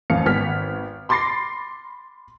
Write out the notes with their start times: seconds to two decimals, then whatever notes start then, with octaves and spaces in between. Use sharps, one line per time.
0.10 A1 F2 F5 C#7
0.26 G#1 B3 F6 B6
1.09 B5 C6 D6 A6 A#6 C7